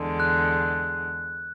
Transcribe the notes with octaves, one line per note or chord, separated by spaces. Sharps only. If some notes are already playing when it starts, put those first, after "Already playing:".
Already playing: E2 D3 G#3
F#6